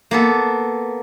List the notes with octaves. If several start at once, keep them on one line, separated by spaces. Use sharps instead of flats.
A#3 B3 A4